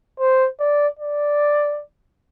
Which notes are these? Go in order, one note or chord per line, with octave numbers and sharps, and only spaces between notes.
C5
D5
D5